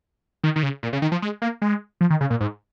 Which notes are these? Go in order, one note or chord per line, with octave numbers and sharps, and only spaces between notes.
D#3
D#3
C#3
A#2
C#3
D#3
F3
G#3
A#3
G#3
F3
D#3
C#3
A#2
G#2